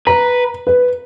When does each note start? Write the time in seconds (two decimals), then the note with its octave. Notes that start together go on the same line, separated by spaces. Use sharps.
0.07 B4 A#5
0.67 B4